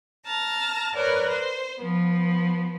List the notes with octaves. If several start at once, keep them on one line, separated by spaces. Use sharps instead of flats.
A5 A#5 F6
A#4 B4 C#5 D5
C5
F3 B3